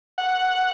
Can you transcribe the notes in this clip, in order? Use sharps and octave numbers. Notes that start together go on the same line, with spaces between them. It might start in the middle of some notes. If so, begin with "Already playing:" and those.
F#5